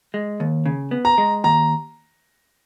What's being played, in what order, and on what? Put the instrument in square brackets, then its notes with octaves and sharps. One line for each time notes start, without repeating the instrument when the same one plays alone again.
[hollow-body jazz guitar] G#3
D#2
C#3
B3
[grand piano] A#5
[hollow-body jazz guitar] G#3
[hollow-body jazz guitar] D#2 [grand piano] A#5